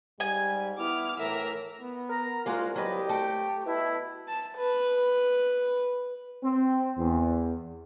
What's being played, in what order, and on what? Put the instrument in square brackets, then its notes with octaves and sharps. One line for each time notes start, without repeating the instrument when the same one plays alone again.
[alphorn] G#2 [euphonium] G3 [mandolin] G#5
[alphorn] B3 [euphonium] E4 [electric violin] D6 F6
[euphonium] A2 [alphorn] E3 [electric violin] A#4 E5
[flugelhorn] B3
[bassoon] A#4 [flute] A#5
[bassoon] C2 [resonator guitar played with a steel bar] G#3 A#3 [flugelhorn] F4 [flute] F#4
[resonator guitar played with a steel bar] F#3 B4 [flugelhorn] G4 [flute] D#5
[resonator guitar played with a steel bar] A3 [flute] G5
[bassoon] B2 [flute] E4 [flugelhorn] E5
[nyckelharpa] A5
B4
[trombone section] C4
E2